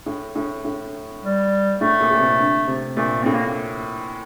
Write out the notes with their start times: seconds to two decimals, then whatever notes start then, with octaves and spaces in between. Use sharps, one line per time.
0.06 A2
0.35 A2
0.65 A2
1.23 G3
1.81 A2 A3
2.00 A#2
2.11 A#2
2.19 C3
2.39 D3
2.67 C3
2.96 A#2 A3
3.23 A2 C4
3.34 A#3